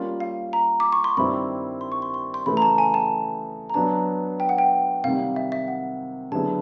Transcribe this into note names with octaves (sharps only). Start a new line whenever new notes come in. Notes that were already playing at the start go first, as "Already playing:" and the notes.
Already playing: G3 A#3 C#4 F4
F5
A#5
D6
C#6
C6
G2 D#3 G3 C4 E4 B5
C6
C#6
C6
C6
C6
C#3 E3 A3 B5
A#5
A5
G#5
A5
A#5
F#3 B3 D4 A5
G5
F#5
G5
C3 D#3 G3 F5
E5
E5
F#5
D3 F#3 B3 E4 G#4 A5